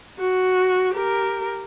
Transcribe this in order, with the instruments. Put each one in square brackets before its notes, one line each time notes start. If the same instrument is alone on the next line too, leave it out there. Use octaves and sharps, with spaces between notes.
[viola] F#4
G4 A#4